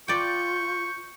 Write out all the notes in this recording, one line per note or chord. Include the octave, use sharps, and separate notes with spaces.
F4 B4 D5 G5 C#6 G6